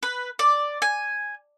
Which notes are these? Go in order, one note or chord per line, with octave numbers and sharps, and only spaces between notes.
B4
D5
G#5